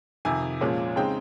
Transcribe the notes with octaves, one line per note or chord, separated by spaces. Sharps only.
F2 C3 D#3 G#5
A#2 F3 G#3 C#4
C#3 G#3 C4 D#4 G5